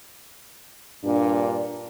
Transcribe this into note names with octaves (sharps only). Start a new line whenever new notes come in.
G2 A#2 D4